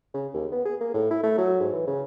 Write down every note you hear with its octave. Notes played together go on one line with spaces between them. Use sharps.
C#3
D#2
B3
G#4
A#3
A2
E4
A3
F#3
G#2
E3
C#3